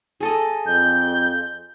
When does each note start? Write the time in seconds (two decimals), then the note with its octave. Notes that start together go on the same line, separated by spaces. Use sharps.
0.20 G#4 A4 D#5
0.66 F2 G6